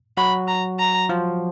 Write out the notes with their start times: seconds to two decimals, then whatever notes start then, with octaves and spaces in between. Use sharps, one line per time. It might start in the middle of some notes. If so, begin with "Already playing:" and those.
0.17 F#3 F#4 B5
0.48 A#5
0.79 A#5
1.09 F3 F4